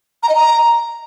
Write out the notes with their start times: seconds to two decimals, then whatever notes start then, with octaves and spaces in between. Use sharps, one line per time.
0.23 A#5
0.29 D#5
0.36 A#5